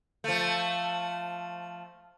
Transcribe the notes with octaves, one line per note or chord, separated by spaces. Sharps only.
F3 A3